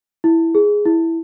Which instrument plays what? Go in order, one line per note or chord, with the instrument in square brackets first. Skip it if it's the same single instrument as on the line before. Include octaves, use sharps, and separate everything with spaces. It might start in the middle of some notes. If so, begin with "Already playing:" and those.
[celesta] E4
G#4
E4